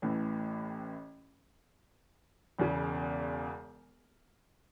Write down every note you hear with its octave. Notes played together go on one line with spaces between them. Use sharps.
A1 A2 E3
E1 E2 C#3